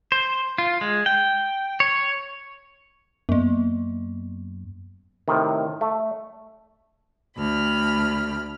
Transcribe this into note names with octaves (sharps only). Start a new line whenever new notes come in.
C5
F4
G#3
G5
C#5
F#2 A#3 B3
A2 C3 D#3
A3
D2 B5 F6